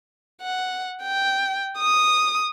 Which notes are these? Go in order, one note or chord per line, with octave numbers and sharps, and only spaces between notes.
F#5
G5
D#6